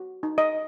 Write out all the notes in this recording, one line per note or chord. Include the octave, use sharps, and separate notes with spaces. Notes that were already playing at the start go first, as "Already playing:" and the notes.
Already playing: F#4
D#4
D#5